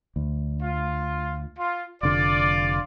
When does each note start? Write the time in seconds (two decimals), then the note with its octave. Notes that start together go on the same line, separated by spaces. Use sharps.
0.16 D2
0.62 F4
1.58 F4
2.03 F1 D3 F4 D5